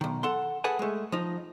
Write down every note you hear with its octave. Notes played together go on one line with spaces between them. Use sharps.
B1 D#3
A4 F#5 C6
G#4 A4 B4 F#5 G#5
G#3 A3
F3 D#4